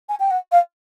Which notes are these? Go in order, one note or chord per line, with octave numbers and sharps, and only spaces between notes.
G#5
G5
F#5
F5